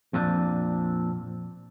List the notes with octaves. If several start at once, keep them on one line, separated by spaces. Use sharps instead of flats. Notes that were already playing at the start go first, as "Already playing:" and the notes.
F2 A#2 C4 D4